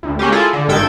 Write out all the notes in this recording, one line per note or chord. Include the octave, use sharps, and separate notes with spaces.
D2
G#3 A#3 C#4 G4
E4 F4 G#4 A4
D3
G#1 G2 D#3 A4 G5 G#6